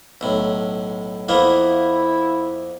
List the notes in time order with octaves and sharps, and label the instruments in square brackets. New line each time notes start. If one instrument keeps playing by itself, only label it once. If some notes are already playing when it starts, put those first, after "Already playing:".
[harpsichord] B1 A2
[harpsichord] F2 A#3 B3 [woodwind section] E4